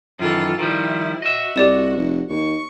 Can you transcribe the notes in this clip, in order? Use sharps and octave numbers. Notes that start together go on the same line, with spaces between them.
F#2 D#3 E3 F4 A4
D#3 F3 G3 E4
F#4 D#5 E5
C2 G4 D5 E7
F1
D#2 C#6